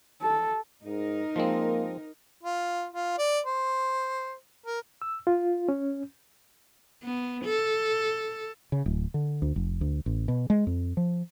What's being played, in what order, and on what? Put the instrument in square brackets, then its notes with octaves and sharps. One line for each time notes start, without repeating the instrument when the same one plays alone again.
[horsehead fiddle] A4
[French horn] G#2 [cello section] D#4 A#4
[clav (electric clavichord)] F3 G#3 C4 [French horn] A#3
[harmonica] F4
F4
D5
C5
A#4
[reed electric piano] E6
F4
C#4
[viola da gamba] B3
A4
[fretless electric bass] C#3
D1
D3
D2
F1
D2
A1
B2
G#3
F2
F3